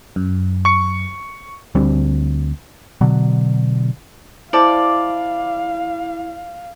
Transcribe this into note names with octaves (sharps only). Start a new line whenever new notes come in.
F#2
C#6 C#7
D2 G3 C4 D4
B2 D3 F#3
E4 C5 D5 F5 A5